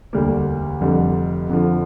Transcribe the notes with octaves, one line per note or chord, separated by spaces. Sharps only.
E1 D2 D3 G3 A#3
F1 F2 D3 G3
F2 D3 F3